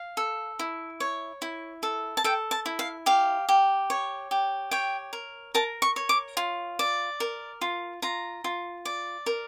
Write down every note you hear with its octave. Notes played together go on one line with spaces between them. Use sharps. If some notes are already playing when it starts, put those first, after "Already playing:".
Already playing: F5
A4
E4
C#5
E4
A4
A5
A4 G5
A5
E4
F5
G4 F5
G4
C#5
G4
C#5 G5
A#4
A#4 A5
C#6
C#5
D6
F4
D5
A#4
F4
F4 A#5
F4
D5
A#4